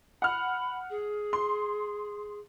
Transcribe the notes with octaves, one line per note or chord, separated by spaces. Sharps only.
F#5 B5 F6
G#4
C6